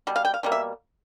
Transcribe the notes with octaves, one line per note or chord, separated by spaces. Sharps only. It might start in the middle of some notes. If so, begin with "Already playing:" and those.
B2 G3
F5
G5
F5
B2 G3 A#3
E5